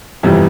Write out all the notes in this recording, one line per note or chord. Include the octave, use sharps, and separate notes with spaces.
G1 F2 C3 E3 G3